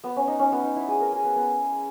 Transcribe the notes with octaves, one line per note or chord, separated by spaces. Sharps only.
B3
C#4
D#4
C#4
B3
D#4
E4
G#4
A#4
G#4
B3
B3